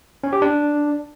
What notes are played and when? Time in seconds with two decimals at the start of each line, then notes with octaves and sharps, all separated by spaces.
0.24 C#4
0.33 G4
0.42 D4